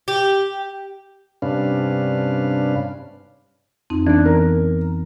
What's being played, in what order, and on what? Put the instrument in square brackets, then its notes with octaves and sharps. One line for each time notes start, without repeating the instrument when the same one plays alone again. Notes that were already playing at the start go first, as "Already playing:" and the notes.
[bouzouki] G4
[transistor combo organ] G2 C3 C#4 D4 B4 F5
[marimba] F2 C4 D#4
[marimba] E3 B3 [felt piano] D4
[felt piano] A#4